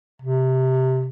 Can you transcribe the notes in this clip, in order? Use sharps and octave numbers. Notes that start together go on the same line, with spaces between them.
C3